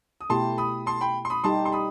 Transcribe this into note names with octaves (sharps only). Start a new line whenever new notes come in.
D#6
B2 A3 E4 G4 A5 C6
B5 D#6
A5 C6
G5 B5
C6
B5 D#6
G3 D#4 G4 A5 C6
C6
B5 D#6